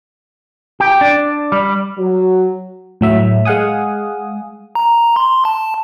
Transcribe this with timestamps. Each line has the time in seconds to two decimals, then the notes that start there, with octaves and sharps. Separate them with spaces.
0.80 G4
1.01 D4
1.52 G3
1.98 F#3
3.01 A2 F#3 E5
3.45 G#3 F5 F#5 G#5 D#6
4.75 A#5
5.16 C6
5.45 A5